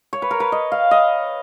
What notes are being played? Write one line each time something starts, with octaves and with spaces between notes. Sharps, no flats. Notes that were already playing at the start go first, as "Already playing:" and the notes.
C#5
B4
A#4
B4
D#5
F5
D#5